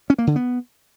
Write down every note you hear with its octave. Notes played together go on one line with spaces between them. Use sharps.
C#4
A#3
D3
B3